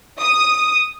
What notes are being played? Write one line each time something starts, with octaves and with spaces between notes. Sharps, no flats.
D#6